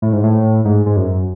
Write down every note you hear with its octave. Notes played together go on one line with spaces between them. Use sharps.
A2
G#2
A2
G#2
G#2
F#2